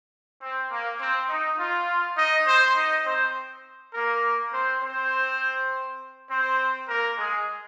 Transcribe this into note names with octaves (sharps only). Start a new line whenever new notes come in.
C4
A#3
C4
D#4
F4
D#4 D#5
C4 C5
D#4 D#5
C4 C5
A#3 A#4
C4 C5
C4 C5
C4 C5
A#3 A#4
G#3 G#4